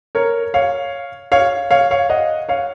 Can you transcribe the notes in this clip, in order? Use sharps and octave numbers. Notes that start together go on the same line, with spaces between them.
A#4 C#5
C#5 F5
C#5 F5
C#5 F5
C#5 F5
D#5 F#5
C#5 F5